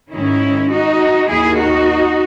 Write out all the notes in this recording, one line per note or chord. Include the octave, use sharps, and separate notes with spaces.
G#2 D#3 C#4 E4
D#4 F#4
D#2 D#3 E4 G#4
D#4 F#4